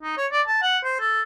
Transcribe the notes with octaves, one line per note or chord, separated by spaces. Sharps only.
D#4
C#5
D5
A5
F#5
C5
A4